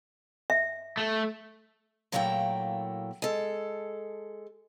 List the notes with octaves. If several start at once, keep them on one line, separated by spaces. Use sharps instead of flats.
E5
A3
A#2 F#3 A3 A#3 E4 G5
G#3 A4